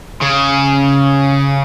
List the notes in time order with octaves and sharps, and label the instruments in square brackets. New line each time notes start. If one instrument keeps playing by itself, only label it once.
[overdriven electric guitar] C#3